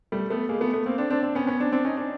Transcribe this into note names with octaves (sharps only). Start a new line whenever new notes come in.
G3 A3
A3 B3
G#3 A#3
A3 B3
A3 B3
A#3 C4
C4 D4
C4 D4
C4 D4
B3 C#4
B3 C#4
C4 D4
C4 D4
C#4 D#4
C4 D4